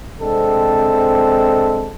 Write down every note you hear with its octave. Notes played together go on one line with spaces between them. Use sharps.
C3 G#3 C4 D4 A4